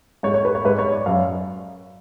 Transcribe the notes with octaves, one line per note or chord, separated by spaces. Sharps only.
G#2 C#5
C#5
B4
C#5
G#2 B4
C#5
D5
F#2 F5